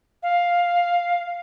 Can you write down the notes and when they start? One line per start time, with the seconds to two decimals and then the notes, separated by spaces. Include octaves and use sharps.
0.23 F5